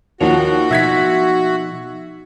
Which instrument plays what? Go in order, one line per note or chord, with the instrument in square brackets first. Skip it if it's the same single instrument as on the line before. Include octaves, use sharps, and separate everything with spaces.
[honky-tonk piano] D#2 F3 [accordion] F#4 [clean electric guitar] C#5 F#5
[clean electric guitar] B2 F3 D#4 [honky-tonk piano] E5 G#6 B6